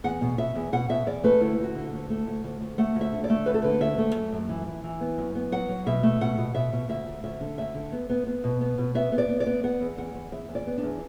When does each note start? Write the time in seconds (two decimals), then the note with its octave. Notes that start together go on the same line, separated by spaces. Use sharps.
0.04 E2 F#5
0.21 B2
0.38 B2 E5
0.55 E2
0.72 B2 F#5
0.89 B2 E5
1.07 E2 D5
1.24 A3 B4
1.41 D2 E4
1.59 D2 F#4
1.75 D3
1.92 D2
2.10 A3
2.27 D2
2.44 D2
2.61 D2
2.78 A3 F#5
2.95 D2
3.01 E5
3.13 D3
3.24 D5
3.30 A3
3.46 D2 B4
3.54 A4
3.62 D3 B4
3.81 D2 E5
3.98 A3
4.15 F#2
4.32 F#2
4.49 E3
4.66 E3
4.84 E3
5.01 B3
5.18 F#2
5.35 B3
5.52 F#3 F#5
5.69 F#3
5.86 B2 E5
6.03 A3
6.21 B2 F#5
6.38 B2
6.54 B2 E5
6.72 B2
6.89 D2 E5
7.06 D2
7.24 D2 E5
7.41 D3
7.58 D2 E5
7.74 D3
7.92 B3
8.09 B3
8.26 B3
8.44 B2
8.61 B3
8.78 B2
8.95 B3 E5
9.12 B3
9.18 D5
9.29 B3
9.40 D5
9.46 B3
9.63 B3 F#5
9.81 E2
9.98 E2 F#5
10.14 E2
10.32 E2 E5
10.49 E2
10.55 D5
10.67 B3
10.78 D4
10.83 E2